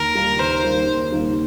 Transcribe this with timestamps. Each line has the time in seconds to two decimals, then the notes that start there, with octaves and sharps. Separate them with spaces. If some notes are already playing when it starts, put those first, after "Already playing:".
Already playing: D#2 A#4
0.15 D#3 G3 A#3 D#4
0.39 D#2 C5
0.63 D#3 G3 A#3 D#4
0.87 D#2
1.11 D#3 G3 A#3 D#4